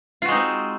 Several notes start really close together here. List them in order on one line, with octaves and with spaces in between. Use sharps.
F4 F#4 G#3 D#4 C4